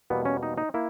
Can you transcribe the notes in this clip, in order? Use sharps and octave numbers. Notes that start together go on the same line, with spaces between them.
E2 B2 G3 A#3 B3
C#4
D#4
D#4
A#3 E4